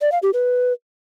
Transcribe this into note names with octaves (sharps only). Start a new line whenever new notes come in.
D5
F5
G4
B4